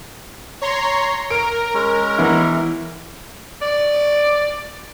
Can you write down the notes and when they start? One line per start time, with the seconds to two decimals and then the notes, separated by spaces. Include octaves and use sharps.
0.62 C#5 A#5 C6
1.30 A#4 D7
1.74 G#3 C#4
2.18 E3 B3 E4
3.62 D5